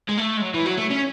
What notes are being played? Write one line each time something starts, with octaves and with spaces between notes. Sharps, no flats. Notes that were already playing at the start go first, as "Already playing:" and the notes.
G#3
A3
G#3
F#3
E3
F#3
A3
C#4